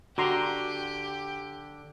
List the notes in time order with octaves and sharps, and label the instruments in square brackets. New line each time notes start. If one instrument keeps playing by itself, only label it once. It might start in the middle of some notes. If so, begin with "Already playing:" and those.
[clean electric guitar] D3 [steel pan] F#4 A#5 C6 [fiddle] G4